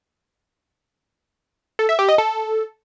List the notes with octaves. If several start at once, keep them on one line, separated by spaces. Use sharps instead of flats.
A4
E5
G4
D#5
A4